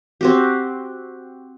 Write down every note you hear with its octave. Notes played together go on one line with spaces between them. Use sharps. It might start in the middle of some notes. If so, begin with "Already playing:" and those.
C4 F#4 G4